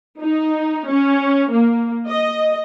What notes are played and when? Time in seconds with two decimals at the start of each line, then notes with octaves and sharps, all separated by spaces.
0.19 D#4
0.88 C#4
1.52 A#3
2.08 D#5